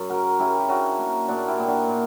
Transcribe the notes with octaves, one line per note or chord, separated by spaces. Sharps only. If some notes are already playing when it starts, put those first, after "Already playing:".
Already playing: F#2
C#3 F#4 A#4
C#3 E4 G4
G4
C#3 D4 F#4
A#3
A#2 D4 F#4
E4 G4
A#2
D4 F#4
A#2